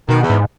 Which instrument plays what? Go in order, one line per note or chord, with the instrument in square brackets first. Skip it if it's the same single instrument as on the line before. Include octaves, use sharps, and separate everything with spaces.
[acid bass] B2 [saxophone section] D#3
[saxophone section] E2
[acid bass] G#2